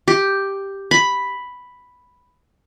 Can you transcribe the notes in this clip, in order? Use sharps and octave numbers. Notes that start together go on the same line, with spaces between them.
G4
B5